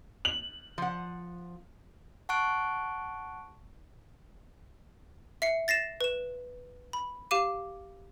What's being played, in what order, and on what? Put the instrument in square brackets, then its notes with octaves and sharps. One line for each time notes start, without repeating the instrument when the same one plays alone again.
[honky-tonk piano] F#7
[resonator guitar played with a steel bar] F3 F#5
[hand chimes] F#5 A5 C#6 F#6 D7
[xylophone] E5 C7 C#7
A6 A#6 C7 E7
B4 E7
B5
G4 F5 D6 D#7